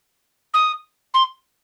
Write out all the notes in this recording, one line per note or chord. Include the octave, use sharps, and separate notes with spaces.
D#6
C6